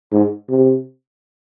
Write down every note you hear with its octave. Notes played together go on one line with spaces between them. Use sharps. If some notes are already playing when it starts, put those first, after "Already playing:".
G#2
C3